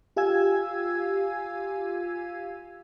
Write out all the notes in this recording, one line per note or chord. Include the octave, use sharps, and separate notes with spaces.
F4 G4 F5 G#5 E6 G#6